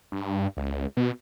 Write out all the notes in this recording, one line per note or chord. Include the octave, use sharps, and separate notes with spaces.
G2
C#2
B2